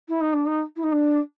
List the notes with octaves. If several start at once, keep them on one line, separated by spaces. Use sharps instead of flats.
E4
D#4
D4
D#4
E4
D#4
D4